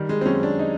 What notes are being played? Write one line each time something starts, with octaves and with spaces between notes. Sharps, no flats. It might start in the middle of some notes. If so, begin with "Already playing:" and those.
Already playing: D#3 G3
G#3
C4
F#2 C#4
D4
D#4